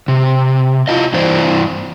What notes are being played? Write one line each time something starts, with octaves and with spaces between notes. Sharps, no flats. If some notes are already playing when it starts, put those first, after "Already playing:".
C3
E4 F4 D#5
G2 E3 E4 C5 D5